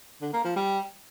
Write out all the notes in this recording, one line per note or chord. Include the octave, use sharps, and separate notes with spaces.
D3
A#3
F3
G3